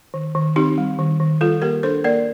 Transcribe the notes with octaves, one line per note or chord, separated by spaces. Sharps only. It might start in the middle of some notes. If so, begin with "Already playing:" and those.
D#3
D#3
C4 D#4 G4
G3
D#3
D#3
G3 F4 A4
A#3 G4 A#4
D4 A4 C5
A#3 A#4 D5